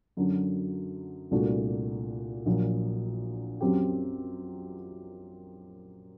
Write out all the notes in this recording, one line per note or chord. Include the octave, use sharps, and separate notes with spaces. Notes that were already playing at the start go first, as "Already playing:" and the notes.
F#2 D3 F#3
C2 A#2 A3 D4 F#4
A#1 A#2 F#3
F#2 F#3 C4 G4